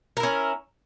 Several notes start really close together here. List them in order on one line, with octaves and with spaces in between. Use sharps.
A#4 E4 C#4